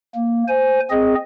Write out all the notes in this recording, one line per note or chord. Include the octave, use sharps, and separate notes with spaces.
A#3
C5 G#5
C4 G#4 D#5